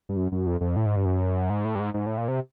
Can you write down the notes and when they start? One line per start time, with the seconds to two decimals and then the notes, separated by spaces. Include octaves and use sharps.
0.09 G2
0.17 F#2
0.32 F#2
0.46 F2
0.61 F2
0.76 A2
0.86 G#2
0.96 G2
1.06 F#2
1.50 G#2
1.65 A2
1.75 G2
1.80 G#2
1.94 G#2
2.06 A2
2.18 A#2
2.28 C3